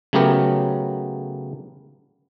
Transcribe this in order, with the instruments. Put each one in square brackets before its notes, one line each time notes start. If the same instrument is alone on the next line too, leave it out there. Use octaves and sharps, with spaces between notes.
[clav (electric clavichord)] C#3 F#3 A3 B3 G4 A#4